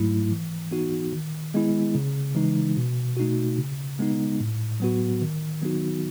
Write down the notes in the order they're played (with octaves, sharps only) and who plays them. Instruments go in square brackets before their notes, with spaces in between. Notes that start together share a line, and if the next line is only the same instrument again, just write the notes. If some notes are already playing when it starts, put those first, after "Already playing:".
Already playing: [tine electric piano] G#2 F#3 A3 E4
E3
B3 D#4 F#4
D#3
G#3 B3 E4
C#3
E3 G#3 D#4
B2
A3 D#4 F#4
C#3
G#3 B3 D#4
A2
F#3 B3 F#4
D#3
F#3 B3 D#4 F#4